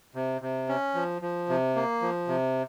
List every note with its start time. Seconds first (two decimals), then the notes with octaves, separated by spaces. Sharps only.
0.15 C3
0.41 C3
0.69 C#4
0.94 F3
1.22 F3
1.49 C3
1.75 A#3
2.01 F3
2.28 C3